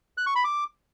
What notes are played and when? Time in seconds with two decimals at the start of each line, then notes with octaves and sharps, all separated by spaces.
0.17 F#6
0.26 C#6
0.35 B5
0.44 D6